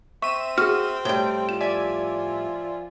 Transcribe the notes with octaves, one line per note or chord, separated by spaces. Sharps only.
C4 E5 C#6 D#7 E7
F#4 G#4 F6
A2 G3 G5
F3 E7
D5 E5 G#5